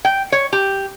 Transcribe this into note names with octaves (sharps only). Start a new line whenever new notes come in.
G5
C#5
G4